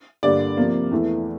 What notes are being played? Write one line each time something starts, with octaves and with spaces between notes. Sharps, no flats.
G2 D3 G3 A#3 D5
C3 F3 A#3
E2 E3 A3